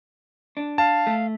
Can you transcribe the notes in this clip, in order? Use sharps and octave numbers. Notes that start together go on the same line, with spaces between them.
D4
F5 A5
A3